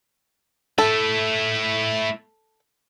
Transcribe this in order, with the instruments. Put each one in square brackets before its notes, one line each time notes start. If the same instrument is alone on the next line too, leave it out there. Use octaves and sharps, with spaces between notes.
[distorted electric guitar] A3 E4 [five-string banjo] A4